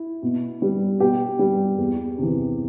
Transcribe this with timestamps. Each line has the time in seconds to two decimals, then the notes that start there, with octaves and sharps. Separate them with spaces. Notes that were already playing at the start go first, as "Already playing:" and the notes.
Already playing: E4
0.22 B2
0.62 G3
1.00 B2 G4
1.39 G3
1.78 E2
2.18 C3 E3